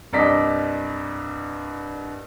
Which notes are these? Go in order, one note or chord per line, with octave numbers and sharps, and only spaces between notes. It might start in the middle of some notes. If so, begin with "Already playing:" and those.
C2 G2 D5 D#5 B6